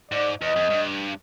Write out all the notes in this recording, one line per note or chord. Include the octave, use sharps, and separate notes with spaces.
G#2 D5
E2 D#5
F2
G2